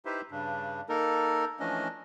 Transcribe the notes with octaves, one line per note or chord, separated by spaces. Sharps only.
D#4 E4 G4 B4 C5 E5
G2 C#3 D4
A#3 D#4 A4 A#4
E3 F3 A3 C#4 D4 D#5